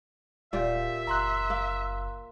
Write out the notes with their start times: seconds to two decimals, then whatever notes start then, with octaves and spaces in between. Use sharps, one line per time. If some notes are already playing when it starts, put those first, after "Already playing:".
0.53 D1 A#2 F4 G4 E5
1.07 F#1 A#5 C6 F#6
1.50 A#3